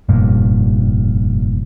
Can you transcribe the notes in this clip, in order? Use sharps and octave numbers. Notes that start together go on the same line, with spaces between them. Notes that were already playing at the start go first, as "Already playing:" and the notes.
F1 G2 A#2